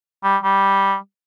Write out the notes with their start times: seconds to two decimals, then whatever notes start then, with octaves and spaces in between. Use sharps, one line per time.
0.23 G3
0.43 G3